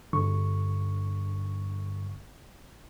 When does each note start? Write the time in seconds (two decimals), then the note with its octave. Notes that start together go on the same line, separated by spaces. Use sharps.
0.13 G1 G2 D3 C#6